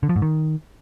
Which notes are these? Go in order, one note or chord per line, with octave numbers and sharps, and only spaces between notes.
D3
F3
G#2
D#3